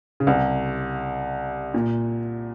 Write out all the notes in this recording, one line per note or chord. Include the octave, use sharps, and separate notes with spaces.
C#3
C2 C3
A#2